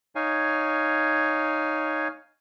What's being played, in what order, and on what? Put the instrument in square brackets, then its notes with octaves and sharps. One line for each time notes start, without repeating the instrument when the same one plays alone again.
[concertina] D#4 C#5 F5 G#5